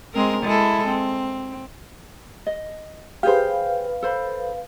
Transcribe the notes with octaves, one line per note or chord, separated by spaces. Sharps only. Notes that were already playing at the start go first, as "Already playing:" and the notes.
G#3 C4 A#4
G#3 E4 A4
C4
D#5
G4 G#4 B4 C5 F5
A4 C5 B5